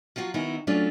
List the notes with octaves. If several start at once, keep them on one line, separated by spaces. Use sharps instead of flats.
F3 F#3 F4 F#4
D#3 F#3 B3 C#4 D#4 E4
F#3 A3 C#4 D4 F4